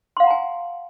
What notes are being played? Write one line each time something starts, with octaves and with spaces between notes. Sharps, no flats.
F5 F#5 G#5 A#5 C6